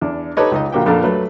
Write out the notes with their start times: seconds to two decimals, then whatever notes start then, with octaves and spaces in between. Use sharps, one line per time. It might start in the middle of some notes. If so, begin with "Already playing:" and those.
0.01 E2 D4
0.37 D#4 G4 A4 B4 C#5 D#5
0.51 C#2 D#4 D#5
0.72 A#1 D3 A#3 F#4 G4 G5
0.86 A#1 F2 D4 A4 A#4
1.03 F#3 A3 B4